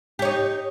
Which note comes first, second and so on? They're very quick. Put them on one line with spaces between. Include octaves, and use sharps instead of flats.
G4 C#5 D#4